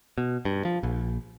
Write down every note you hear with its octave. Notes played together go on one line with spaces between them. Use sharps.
B2
G2
F3
A#1